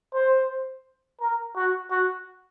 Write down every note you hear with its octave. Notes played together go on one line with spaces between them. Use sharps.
C5
A#4
F#4
F#4